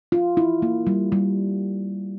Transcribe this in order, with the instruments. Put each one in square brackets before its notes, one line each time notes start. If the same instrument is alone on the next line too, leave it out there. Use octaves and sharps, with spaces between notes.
[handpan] F4
E4
A#3
G3
G3